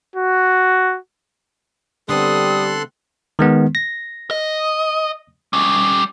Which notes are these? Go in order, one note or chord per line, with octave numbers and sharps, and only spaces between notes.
F#4
D3 G3 B3 C4 A4 C6 D#6 F#6
D#3 G#3 B3
A#6
D#5
G3 C#4